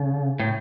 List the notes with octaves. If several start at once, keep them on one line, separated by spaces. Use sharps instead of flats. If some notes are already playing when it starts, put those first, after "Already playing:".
Already playing: C#3
A2